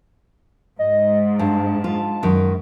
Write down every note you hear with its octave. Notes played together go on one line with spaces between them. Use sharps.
G#2 D#5
G2 A5
F4
F#2 D#3